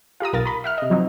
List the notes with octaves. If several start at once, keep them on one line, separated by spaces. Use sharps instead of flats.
F4 G4 A#5 D#6
B1 A#4 F5 A6
A#5 B5
E5 F#5 F6
C3 D#5
F3 F#3 C4 D#4